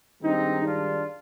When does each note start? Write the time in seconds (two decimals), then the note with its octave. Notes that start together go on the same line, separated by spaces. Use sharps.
0.22 G2 D#3 G#3 C4 D#4
0.64 D4 F4